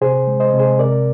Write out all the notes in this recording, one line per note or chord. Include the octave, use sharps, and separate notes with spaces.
C3 G#4 C5
G#3
C5 D#5
C3
G#4 C5
C3 A#4 D5